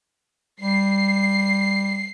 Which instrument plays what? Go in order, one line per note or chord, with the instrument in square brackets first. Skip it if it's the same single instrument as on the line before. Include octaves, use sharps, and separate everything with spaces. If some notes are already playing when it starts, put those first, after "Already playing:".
[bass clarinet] G3 [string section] C7